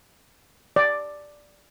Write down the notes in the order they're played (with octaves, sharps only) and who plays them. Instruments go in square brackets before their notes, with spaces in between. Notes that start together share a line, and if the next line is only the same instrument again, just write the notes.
[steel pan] D5